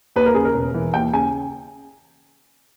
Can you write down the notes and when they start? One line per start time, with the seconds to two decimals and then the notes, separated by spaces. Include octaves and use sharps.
0.16 D#2 B4
0.26 A#4
0.35 C#3 G#4
0.45 A#4
0.54 E1
0.74 E3
0.93 D#2 G5
1.13 C#3 G#5